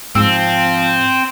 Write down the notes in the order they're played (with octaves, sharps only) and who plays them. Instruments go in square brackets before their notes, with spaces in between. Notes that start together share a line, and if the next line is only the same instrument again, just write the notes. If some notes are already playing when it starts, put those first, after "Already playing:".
[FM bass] G#2 [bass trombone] F3 [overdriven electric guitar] C4 [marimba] E6